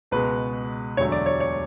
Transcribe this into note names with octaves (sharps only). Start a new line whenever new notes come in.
C#2 B2 G#3 B4
E1 D2 D3 F#3 A3 C#5
D5
C#5
C#5